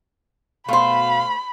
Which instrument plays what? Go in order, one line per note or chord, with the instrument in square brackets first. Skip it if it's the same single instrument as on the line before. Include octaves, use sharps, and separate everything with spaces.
[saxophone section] B2 F5 [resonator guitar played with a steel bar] A3 C5 [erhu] B5